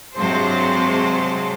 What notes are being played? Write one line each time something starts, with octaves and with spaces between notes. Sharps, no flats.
G2 C3 F#3 G#3 C5 A5